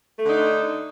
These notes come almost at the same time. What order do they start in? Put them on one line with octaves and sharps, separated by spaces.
A3 D3 D4 D#4